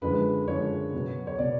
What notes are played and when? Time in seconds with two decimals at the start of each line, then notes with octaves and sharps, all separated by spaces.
0.02 F#2 D3 F3 G#3 B4
0.47 F#2 D3 F3 G#3 C#5
0.93 B2 F#3 B3
1.27 C#5
1.39 B2 F#3 B3 D5